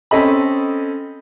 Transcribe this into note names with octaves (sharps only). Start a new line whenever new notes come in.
C4 C#4 A4 D#5 B5